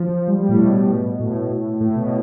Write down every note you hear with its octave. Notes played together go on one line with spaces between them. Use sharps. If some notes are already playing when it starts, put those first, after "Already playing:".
Already playing: F3
G3
G3
A2
B2
A2
A2
B2